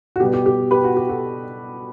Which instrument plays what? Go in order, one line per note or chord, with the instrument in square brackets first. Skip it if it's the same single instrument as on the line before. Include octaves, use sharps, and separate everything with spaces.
[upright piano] F#4
B2 G3 B3 G4
G4
G4
G4 B4
F#4
G4
F#4 A4